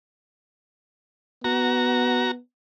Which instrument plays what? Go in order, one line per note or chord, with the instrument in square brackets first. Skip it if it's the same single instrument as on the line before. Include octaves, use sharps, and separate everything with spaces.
[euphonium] B3 [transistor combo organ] F#4 A#5